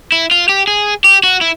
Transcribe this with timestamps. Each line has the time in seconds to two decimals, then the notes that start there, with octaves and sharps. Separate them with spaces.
0.12 E4
0.31 F4
0.49 G4
0.67 G#4
1.04 G4
1.23 F#4
1.41 E4